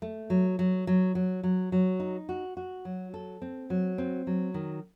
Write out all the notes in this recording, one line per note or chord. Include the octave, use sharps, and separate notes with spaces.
A3
F#3
F#3
F#3
F#3
F#3
F#3
D#4
F#4
F#4
F#3
A4
C4
F#3
C4
F#3
D#3